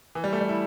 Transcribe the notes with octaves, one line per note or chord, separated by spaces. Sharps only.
E3
G3
A3
G3
E4